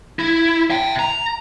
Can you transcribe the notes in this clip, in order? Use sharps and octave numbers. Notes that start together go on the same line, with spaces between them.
E4
E5 G5
A#5